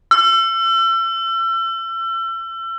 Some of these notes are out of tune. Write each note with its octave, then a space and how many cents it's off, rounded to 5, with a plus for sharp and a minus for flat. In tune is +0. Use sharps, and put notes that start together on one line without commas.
E6 +35